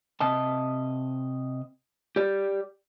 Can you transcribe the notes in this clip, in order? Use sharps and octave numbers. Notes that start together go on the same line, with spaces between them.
C3 D#5 A5
G4 D5